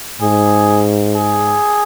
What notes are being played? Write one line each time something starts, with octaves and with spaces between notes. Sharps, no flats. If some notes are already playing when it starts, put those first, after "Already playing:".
G#2 G#4
G#4